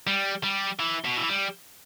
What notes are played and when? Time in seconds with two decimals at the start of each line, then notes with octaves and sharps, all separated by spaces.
0.07 G3
0.44 G3
0.80 E3
1.05 B2
1.17 E3
1.29 G3